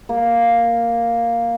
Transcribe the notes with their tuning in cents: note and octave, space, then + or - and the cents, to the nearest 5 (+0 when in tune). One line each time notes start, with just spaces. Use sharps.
A#3 +0